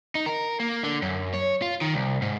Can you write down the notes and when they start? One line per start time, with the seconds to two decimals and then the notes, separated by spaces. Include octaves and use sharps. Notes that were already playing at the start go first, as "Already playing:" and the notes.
0.15 D#4
0.26 A#4
0.60 A#3
0.84 D3
1.02 F#2
1.34 C#5
1.62 F4
1.81 D#3
1.94 C2
2.22 G#2